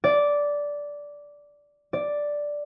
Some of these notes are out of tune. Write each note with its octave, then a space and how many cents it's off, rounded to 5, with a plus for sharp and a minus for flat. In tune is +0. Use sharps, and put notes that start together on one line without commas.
D5 -10
D5 +0